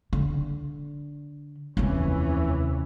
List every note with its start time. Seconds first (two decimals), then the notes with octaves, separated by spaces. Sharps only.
0.13 D3
1.77 F1 D#2 C3 E3 C#4